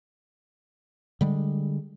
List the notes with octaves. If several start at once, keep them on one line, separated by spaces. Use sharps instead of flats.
D3 G3 G#3